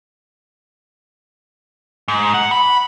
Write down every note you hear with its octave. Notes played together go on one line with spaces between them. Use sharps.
G#2
F#5
B5